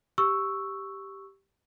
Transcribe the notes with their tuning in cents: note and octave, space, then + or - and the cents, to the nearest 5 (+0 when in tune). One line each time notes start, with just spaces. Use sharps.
G4 +0 C#6 +0 E6 +0